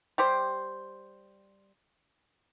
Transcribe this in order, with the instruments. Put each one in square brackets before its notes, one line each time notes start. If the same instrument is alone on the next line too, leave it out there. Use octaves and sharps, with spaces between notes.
[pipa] G3 G4 C5